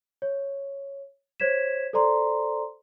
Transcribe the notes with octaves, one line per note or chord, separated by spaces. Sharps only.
C#5
C5 C#5 G#6 B6 E7
A4 C5 D5 A#5 C6